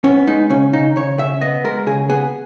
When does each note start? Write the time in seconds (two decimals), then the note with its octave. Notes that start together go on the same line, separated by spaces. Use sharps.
0.04 B3 C#4
0.27 G#3 D#4
0.50 C#3 C#4
0.73 C#3 D#4
0.96 C#3 C#5
1.18 C#3 E5
1.41 B3 D#5
1.64 G#3 A#4
1.86 C#3 G#4
2.09 B3 G#4